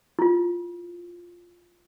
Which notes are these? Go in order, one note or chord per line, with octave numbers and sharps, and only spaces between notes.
E4 F4